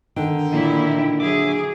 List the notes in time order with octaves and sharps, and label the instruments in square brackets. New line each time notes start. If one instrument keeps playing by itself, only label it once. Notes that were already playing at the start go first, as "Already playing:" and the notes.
[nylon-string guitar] D3 [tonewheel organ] D#3 D#4 G5
[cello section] A#2 E4
[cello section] F#3 G#4 [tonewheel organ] E5 D6